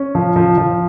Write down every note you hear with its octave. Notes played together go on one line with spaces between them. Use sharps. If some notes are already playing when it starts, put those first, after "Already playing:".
Already playing: C#4
F3
F3
F3